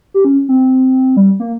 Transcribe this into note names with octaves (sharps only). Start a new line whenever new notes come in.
G4
C#4
C4
G3
A#3